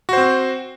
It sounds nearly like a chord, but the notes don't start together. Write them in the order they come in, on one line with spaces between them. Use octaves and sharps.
F#4 C5 C4